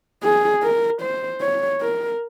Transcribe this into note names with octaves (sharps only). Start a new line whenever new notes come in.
G#4
A#4
C5
C#5
A#4